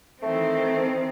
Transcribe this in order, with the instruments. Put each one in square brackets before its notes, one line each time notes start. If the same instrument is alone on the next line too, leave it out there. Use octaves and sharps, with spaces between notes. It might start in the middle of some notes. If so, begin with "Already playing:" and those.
[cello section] D#3 E3 C4 [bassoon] A3